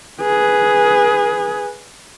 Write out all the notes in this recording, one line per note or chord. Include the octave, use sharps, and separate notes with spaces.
G#4 B4